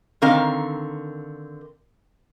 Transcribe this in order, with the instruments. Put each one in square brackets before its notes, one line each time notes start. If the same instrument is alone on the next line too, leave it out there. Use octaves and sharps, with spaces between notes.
[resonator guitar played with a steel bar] D3 D#3 C4 A#4 F5